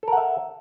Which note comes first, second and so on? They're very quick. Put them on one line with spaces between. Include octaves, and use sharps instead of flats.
A4 A#4 F#5 E5